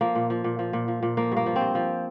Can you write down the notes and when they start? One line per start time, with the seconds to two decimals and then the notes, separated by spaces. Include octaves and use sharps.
0.01 F3 A#3
0.15 A#2
0.30 F3
0.44 A#2
0.59 F3
0.73 A#2
0.88 F3
1.03 A#2
1.17 F3 A#3
1.32 G2 A#3
1.46 F3
1.56 G2 C4
1.75 F3